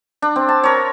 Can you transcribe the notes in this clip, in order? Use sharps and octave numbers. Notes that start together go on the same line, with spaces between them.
D4
C4
A5
A#4 C#5